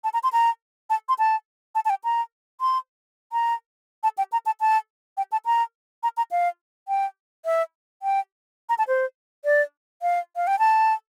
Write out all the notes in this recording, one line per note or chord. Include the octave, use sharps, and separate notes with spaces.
A5
A#5
C6
A#5
A5
C6
A5
A5
A5
G5
A#5
C6
A#5
A5
G5
A#5
A5
A5
G5
A5
A#5
A#5
A#5
F5
G5
E5
G5
A#5
A5
C5
D5
F5
F5
G5
A5